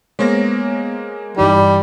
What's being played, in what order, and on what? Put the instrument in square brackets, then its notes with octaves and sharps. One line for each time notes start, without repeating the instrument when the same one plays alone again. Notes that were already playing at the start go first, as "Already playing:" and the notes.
[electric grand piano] G#3 A#3 A#6 [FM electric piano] B3 C5 C#5
[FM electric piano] G2 E3 D#4 [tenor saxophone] G3